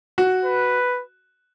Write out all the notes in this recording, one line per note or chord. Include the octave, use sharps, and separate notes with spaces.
F#4
B4